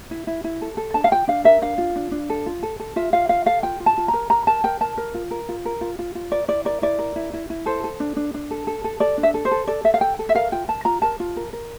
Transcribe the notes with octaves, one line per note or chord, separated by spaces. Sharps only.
E4
E4
E4
A4
A4
D4 A5
F5
F4 G5
D4 F5
A#4 E5
D4 F5
F4
D4
D4
A4
F4
A4
A4
F4 E5
F4 F5
F4 F5
A4 F5
F4 G5
F4
A5
F4
A#5
A#4
A#4 A#5
A#4 A5
A#4 G5
A#4 A5
A#4
F4
A#4
F4
A#4
F4
F4
F4
A#4 D5
E4 D5
A#4 D5
E4 D5
A#4
E4
E4
E4
A4 C5
A4
D4
D4
D4
A4
A4
A4
A4 D5
D4
E5
A4
C5
A4
A4 D5
A4 E5
F5
A4 G5
A4
E5
A#4 F5
F4 G5
A#4 A5
F4 A#5
A#4 A5
F4
A#4
A#4